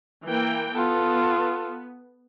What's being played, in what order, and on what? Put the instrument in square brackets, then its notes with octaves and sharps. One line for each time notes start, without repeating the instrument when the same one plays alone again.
[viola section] E3 A#3 G5
[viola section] B3 [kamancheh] F4 A4